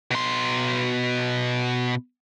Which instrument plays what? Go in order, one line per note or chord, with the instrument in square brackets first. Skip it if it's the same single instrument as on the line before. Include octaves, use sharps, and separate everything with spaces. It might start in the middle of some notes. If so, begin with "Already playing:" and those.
[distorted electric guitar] B2 C6